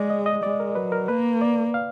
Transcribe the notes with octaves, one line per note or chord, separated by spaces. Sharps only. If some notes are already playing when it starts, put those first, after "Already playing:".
Already playing: G#3 D5
D#5
D#5
G#3 D5
A#4
F#3 B4
A#4
A#3 B4
D5
F5